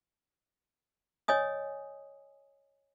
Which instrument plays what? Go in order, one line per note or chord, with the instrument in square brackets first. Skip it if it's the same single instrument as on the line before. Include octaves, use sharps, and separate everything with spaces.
[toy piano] C#5 D#5 G#5 D#6